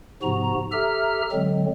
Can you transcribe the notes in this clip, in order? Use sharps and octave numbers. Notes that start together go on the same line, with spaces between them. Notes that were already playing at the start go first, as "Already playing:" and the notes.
G#2 C3 F3 B3 F#4 A#5
G4 A4 E5 A#5 F6
D3 F#3 G#3 C4